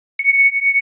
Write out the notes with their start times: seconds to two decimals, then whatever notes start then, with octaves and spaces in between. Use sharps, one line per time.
0.19 C#7